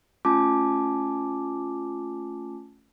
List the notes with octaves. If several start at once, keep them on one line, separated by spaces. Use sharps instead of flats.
A3 C#4 F4 G#5 A5 D6